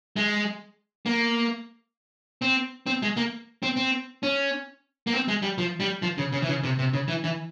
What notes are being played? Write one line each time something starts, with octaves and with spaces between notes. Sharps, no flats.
G#3
A#3
C4
C4
G#3
A#3
C4
C4
C#4
A#3
C4
G#3
G3
F3
G3
F3
C#3
C#3
E3
C#3
C3
C3
C#3
E3
E3